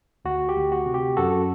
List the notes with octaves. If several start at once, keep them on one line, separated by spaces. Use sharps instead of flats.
D2 F#4
G4
D2
F#4
C3
G4
F#2 F#4 A4